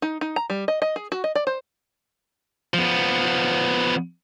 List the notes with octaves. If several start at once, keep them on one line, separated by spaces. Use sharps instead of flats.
D#4
D#4
A#5
G3
D#5
D#5
G#4
F#4
D#5
D5
C5
F3 B3